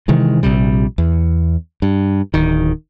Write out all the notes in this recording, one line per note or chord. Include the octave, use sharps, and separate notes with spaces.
C3 D#3 E3 G#3
A#1 D#2 C3 G3
E2
G2
D1 D#3